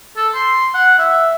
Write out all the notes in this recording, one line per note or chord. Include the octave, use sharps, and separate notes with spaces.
A4
C6
F#5
E5